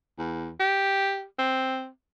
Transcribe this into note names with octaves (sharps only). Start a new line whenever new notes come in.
E2
G4
C4